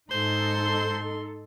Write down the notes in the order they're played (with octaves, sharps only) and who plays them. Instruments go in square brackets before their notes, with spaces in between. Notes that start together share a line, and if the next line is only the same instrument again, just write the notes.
[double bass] G#2 [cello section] D#4 A4 [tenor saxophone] C5 [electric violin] C6